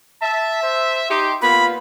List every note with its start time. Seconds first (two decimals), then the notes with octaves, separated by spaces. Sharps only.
0.22 E5 A5
0.63 C5
1.10 D#4 G4 C6
1.42 A#2 A#3 B3 F4 B5